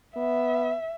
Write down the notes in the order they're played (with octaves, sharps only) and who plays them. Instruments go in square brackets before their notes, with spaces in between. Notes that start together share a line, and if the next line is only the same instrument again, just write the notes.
[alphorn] B3 [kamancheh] E5